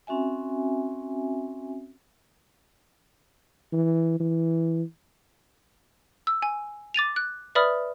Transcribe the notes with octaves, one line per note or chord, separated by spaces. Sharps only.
C4 C#4 F#4 E5 G#5
E3
E3
E6
G#5
D6 A6 D#7 F7
F#6
B4 D5 E5 B5 D#6 F6